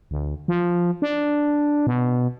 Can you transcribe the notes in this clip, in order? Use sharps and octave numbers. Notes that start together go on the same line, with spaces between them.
D2
F3
D4
B2